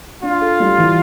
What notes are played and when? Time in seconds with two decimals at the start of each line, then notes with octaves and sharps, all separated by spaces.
0.23 D4 F4
0.41 A4
0.60 G3
0.78 E3